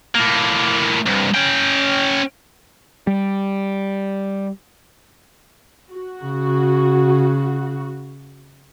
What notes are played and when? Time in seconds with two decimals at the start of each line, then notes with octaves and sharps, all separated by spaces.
0.15 A2 A#3
1.06 C2 G2
1.35 C#4 G5
3.07 G3
5.91 F#4
6.24 C#3